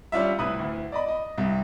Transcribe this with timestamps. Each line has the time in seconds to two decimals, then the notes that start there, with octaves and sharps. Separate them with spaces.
0.12 G3 C#4 D4 F4 E5
0.38 C2 A2 E4 B4 D#6
0.59 D2 A2
0.92 D5 D#5 B5
1.08 D#5
1.38 C2 G2